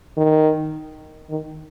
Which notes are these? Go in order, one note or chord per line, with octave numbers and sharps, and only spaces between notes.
D#3
D#3